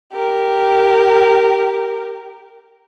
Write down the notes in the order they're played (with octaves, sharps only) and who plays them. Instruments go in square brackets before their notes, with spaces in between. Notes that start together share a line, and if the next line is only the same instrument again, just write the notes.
[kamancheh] G4 A#4